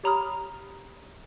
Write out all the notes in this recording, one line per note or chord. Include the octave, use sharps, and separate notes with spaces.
G4 C#5 A#5 B5 D#6 F6